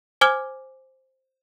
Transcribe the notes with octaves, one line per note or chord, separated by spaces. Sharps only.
C5 G#5 D6 F6 G#6 G7